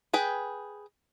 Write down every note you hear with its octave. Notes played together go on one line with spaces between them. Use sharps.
G#4 B4 G5